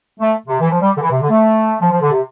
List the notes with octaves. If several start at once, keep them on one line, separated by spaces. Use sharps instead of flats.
A3
C3
E3
F3
G3
D3
E3
C3
D3
A3
F3
F3
D3
C3